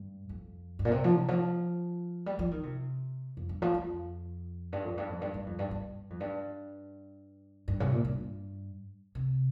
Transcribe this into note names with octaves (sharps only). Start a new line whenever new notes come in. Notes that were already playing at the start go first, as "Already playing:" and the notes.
Already playing: G2
F2
G2
A#2
C3
F3
C3
F3
G3
F3
D#3
C3
F2
G2
F3
F2
G2
F2
G2
F2
G2
G2
F2
G2
G2
F2
G2
G2
C3
A#2
G2
C3